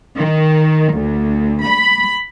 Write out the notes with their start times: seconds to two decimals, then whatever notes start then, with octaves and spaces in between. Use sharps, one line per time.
0.18 D#3
0.94 D2
1.66 B5